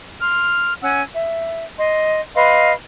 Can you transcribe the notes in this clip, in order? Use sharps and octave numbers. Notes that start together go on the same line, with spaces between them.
C6 F6
C#4 F#5 G#5 E6
E5
D#5 C6
B4 D#5 F5 C6